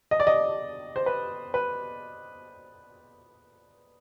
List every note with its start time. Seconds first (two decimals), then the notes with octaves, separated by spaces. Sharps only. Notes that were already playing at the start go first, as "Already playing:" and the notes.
0.11 D#5
0.20 D5
0.27 D#5
0.96 C5
1.06 B4
1.54 B4